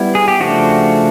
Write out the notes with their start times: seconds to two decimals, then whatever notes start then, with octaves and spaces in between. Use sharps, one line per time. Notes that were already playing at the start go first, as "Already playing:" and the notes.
Already playing: G3 B3 E4
0.15 G#4
0.28 G4
0.40 C#3 F3 A3 D4 F#4